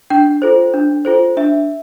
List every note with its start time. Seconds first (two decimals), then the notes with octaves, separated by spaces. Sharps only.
0.10 D4 G5
0.42 F4 A4 C5
0.74 D4
1.05 F4 A4 C5
1.37 D4 E5